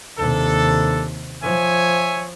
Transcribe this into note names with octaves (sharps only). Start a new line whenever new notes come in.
D#2 C3 D4 A4
F3 C#5 E5 G#5